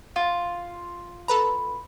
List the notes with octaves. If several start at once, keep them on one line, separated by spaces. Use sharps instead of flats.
F4
A4 B4 A#5 B5